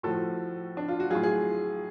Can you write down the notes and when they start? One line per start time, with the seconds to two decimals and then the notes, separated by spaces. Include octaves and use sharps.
0.03 A2 F3 F#4 A4
0.77 D4
0.88 F4
1.00 F#4
1.10 F#3 F4 G#4
1.15 A2
1.23 F4 G#4